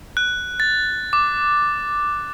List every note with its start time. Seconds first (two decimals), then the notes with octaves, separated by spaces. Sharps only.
0.17 F#6
0.60 A6
1.13 D6